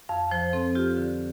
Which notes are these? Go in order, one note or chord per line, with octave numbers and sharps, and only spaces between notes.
F2 F5
F3 C5
C4 A4
F4 G4
D3